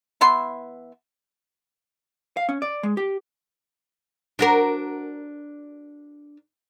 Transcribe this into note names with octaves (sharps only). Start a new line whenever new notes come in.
E3 B3 E5 C6
F5
C#4
D5
G#3
G4
D4 F#4 A#4